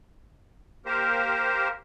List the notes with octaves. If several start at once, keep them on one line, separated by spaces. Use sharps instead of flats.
A#3 G4 A#4 C5